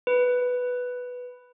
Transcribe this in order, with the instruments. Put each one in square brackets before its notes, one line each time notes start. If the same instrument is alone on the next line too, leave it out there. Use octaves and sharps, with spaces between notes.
[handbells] B4